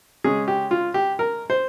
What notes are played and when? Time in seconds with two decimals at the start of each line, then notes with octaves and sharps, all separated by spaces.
0.24 C#3 G#3 C#4 G#4
0.48 G4
0.71 F4
0.94 G4
1.19 A#4
1.50 C5